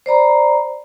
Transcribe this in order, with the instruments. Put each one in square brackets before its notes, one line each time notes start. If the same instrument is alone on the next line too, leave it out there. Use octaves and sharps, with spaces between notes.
[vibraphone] C5 D5 A#5 B5